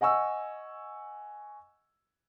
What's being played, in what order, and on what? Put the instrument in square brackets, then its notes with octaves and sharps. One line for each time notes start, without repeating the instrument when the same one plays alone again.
[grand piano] D#5 F#5 G#5 C#6 E6